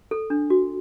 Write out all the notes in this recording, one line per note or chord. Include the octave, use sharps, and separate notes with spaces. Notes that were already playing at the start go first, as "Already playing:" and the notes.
A4
D4
F#4